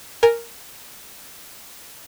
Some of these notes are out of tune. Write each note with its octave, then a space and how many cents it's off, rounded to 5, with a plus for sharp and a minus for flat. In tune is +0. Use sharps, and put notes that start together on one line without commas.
A#4 +0 G#5 -5